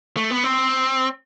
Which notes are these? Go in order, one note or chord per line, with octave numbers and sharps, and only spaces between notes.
A3
B3
C4